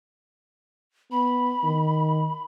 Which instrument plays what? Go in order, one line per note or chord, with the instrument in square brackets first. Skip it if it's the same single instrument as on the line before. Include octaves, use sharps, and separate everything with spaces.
[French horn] B3 [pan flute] B5
[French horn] D#3